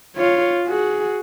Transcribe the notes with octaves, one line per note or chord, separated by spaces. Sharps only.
F4 C#5
F#4 G#4